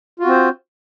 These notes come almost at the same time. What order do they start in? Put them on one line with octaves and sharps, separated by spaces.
F4 F#4 C4 C5